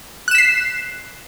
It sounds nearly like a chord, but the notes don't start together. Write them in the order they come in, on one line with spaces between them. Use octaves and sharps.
F#6 E7 B6 C7